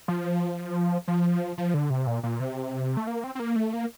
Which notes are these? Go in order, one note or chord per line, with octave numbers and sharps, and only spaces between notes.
F3
F3
F3
D3
C3
A#2
A#2
C3
A3
A#3
C4
C4
A#3
A3
A#3